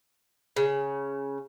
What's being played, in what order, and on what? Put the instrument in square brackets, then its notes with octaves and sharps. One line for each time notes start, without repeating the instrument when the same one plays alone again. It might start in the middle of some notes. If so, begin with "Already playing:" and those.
[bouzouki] C#3